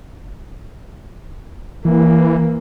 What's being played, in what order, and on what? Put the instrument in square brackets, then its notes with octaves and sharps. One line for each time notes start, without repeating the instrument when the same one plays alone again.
[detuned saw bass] E3 [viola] A#3